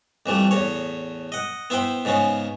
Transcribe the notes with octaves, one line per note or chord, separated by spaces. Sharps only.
F2 E3 G3 A3
E2 A2 C#5
D#5 F#5
B3 E4 C5 G5 B5
G#2 C#3 B3 C#4